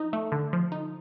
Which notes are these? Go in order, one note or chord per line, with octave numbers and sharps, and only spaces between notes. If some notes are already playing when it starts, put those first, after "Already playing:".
Already playing: F3 D#4
A3
D3
F3
D#4